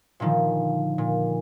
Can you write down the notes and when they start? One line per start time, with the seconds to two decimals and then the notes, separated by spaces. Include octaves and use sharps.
0.20 A#2 D3 D#3 F3
0.98 A#2